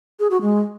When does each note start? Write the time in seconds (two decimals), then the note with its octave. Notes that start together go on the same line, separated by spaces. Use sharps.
0.20 G#4
0.31 F#4
0.42 G#3